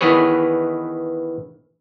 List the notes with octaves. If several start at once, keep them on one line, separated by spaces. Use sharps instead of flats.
D#3 E3 B3 G#4 B4 C#5